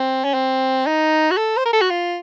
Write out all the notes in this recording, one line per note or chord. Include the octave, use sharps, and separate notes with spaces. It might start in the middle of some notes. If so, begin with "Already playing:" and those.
Already playing: C4
C#4
C4
D#4
F#4
A4
C5
A#4
A4
F#4
F4